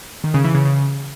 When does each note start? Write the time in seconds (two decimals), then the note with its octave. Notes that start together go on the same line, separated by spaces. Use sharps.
0.24 D#3
0.34 C#3
0.44 E3
0.55 C#3
0.65 C#3